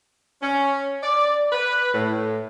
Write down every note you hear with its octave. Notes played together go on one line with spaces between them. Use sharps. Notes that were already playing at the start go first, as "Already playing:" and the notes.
C#4
D5
B4
A2